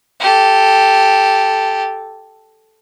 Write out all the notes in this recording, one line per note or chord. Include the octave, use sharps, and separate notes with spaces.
G4 A4